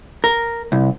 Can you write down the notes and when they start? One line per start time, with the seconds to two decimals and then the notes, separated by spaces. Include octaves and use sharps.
0.24 A#4
0.72 C2